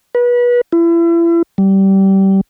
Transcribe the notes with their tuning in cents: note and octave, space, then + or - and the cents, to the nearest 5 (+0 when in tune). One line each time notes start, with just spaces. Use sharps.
B4 -30
E4 +35
G3 -20